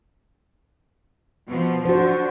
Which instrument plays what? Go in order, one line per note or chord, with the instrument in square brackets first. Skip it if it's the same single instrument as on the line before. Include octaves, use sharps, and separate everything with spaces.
[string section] B2 F3
[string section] D3 [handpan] F#4 C5